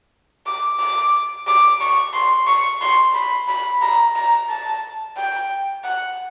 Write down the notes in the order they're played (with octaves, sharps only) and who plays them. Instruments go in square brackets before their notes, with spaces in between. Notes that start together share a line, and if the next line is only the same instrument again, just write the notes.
[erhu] D6
D6
D6
C#6
C6
C#6
C6
B5
B5
A#5
A#5
A5
G5
F#5